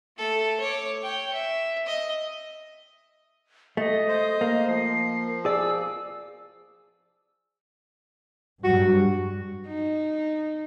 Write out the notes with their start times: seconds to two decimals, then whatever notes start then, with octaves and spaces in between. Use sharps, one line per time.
0.17 A3 A4
0.60 C#5 D6
1.03 C#5 G5
1.33 E5
1.87 D#5
3.77 A3 D#5
4.09 C5
4.41 A#3
4.68 F3 C7
5.45 G#4 D5 E6
8.64 G2 F#3 G3 F#4
9.67 D#4